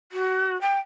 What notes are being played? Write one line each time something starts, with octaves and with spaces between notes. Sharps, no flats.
F#4
G5